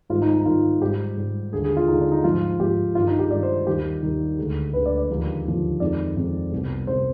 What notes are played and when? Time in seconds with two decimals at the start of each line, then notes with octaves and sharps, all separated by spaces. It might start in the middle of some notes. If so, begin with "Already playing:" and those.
0.10 G#2 D#3 G3 F4
0.22 D#4
0.34 D#4
0.45 G#2 D#3 G3 F4
0.81 G#2 G3 G4
1.17 G#2 G3
1.52 D#2 D3 G#3 G#4
1.64 G#4
1.77 F4
1.88 D#2 D3 G#3 D#4
2.00 D4
2.12 D#4
2.24 G#2 F3 G#3 F4
2.60 G#2 F3 G#3 G4
2.95 G2 D#3 G#3 F4
3.08 D#4
3.19 G4
3.31 G2 D#3 G#3 D5
3.43 C5
3.66 D#2 D#3 G3 G4
4.03 D#2 D#3 G3
4.38 D2 D3 G#3
4.74 D2 D3 G#3 B4
4.86 D5
4.97 D5
5.10 D#2 D3 F3 G#3
5.45 D#2 D3 F3 G#3
5.80 F2 D#3 G#3 D5
6.17 F2 D#3 G#3
6.52 C2 B2 G3
6.87 C2 B2 G3 C5